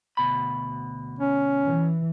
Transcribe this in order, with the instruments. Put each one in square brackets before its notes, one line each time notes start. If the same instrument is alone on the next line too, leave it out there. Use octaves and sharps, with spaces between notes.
[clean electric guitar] D2 B2 B5
[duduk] C#4
[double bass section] E3